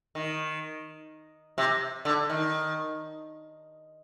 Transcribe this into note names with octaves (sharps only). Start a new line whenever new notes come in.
D#3
C3
D3
D#3